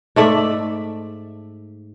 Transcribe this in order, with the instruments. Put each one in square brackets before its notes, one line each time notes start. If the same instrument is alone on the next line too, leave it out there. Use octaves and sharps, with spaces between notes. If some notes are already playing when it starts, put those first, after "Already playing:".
[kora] G#2 A3 D5 E5